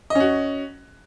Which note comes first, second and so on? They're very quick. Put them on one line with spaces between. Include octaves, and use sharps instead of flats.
D#5 C#4 F#4